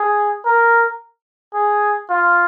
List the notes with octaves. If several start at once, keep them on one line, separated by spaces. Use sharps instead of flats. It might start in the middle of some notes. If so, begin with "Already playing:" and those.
Already playing: G#4
A#4
G#4
F4